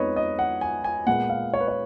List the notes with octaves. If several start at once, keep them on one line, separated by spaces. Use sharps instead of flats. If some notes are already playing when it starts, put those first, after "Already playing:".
Already playing: F2 F3 G#3 B3 D#4 B4 C#5 D#5
D#5
F#5
G#5
G#5
A#2 G#3 B3 F#5
F5
C#5
B4
C#5